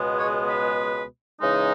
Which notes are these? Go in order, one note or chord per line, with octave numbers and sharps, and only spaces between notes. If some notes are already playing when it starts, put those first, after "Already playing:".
Already playing: C#2 B2 G#3 B3
C#5
B4
C#3 E3 G#3 D#4